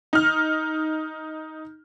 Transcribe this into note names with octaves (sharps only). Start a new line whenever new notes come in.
D#4 F6